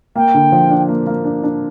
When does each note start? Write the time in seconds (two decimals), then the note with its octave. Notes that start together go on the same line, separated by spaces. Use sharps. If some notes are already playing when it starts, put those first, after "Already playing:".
0.16 A#3 G5
0.34 D3
0.52 F3
0.70 D4
0.89 A#3
1.07 A#3
1.24 D4
1.43 D4